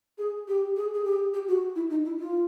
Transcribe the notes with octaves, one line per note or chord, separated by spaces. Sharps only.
G#4
G4
G#4
G#4
G4
G4
F#4
E4
D#4
E4
F4